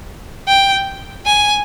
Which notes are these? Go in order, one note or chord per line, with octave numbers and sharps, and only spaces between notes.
G5
G#5